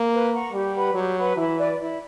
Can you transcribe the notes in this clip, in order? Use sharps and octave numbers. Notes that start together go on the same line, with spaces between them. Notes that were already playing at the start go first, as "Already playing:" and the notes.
Already playing: A#3
B4
F#5 A#5 C#6
G3 G4
B4 F#5 B5
F#3 G4
B4 F#5 B5
E3 E4
B4 D5
E4